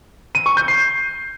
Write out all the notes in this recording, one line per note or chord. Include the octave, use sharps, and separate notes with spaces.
D#7
C#6
G6
C7